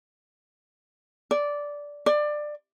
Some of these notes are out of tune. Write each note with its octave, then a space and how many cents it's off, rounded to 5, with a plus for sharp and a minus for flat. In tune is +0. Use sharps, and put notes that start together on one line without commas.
D5 -10
D5 +20